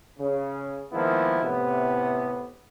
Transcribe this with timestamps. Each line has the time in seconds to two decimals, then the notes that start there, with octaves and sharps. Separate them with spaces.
0.19 C#3
0.92 D#3 F3 G#3 A#3 B3 E4
1.42 A2 C3 B3